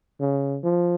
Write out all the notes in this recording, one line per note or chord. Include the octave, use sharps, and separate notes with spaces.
C#3
F3